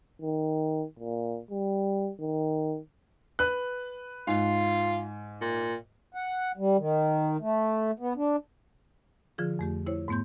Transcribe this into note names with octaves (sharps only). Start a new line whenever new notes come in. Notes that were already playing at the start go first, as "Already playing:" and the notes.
D#3
A#2
G3
D#3
B4 F#6
G#2 F4
A#2
F#5
G3
D#3
A3
B3
D4
D3 F3 F4 G#4
F2 A3 G4
E4 C5 C#5
G#2 A3 B3 C6 G6